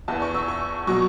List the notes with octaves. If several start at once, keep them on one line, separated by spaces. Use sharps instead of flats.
E2 E3 A5
C#6
E6
C#6
B2 F#3 C#6